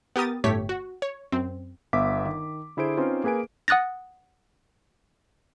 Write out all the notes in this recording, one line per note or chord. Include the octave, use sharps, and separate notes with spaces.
B3 G4 A#4 D#6 A6
G1 A2 A3 G4 C#5 B6
F#4
C#5
F#2 C4
G1 B3 E5 F5 D6 B6
D#3
D3 E4 G#4 C5 D7
C4 C#4 D#4 F4 B4 C5
A#3 G#4 B4 G#5 D7
F#5 D#6 F#6 A6 A#6